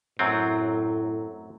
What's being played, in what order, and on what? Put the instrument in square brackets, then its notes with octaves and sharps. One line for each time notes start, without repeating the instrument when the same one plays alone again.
[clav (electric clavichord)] F#2 F#3 C4 [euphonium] A2